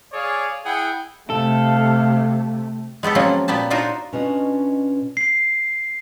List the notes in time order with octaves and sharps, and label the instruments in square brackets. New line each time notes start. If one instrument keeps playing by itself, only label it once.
[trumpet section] G#4 C#5 D5 F5
E4 G#4 F#5 G5
[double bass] C3 A3 [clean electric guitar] A4 [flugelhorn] F5
[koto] G#3 B3 G4 A4
F3 F#3 G#3 A#3 C4 C#4
A#2 F#3 B3 G4 A5
D4 D#4 F4 F#4 A#4 C5
[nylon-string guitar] B2 C#4 D4 F4 D#5
[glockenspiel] C7